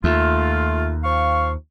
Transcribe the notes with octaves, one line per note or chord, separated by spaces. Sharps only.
D#2 A3 F4
F3 F5 C#6